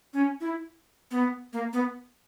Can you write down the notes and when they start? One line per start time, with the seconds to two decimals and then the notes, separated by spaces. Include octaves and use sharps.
0.14 C#4
0.41 E4
1.11 B3
1.53 A#3
1.73 B3